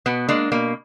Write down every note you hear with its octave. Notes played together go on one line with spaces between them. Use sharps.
B2 B3
G#3 A#3 D4
B2 A#3